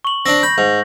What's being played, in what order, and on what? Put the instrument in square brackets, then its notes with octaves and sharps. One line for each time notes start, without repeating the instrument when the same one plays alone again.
[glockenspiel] C#6 F#7
[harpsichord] C4 D4 [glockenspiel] A#6 F#7
[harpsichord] B5 [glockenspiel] G6 A#6
[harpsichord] G#2